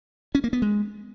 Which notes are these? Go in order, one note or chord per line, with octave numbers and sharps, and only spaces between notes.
C#4
A#3
B3
G#3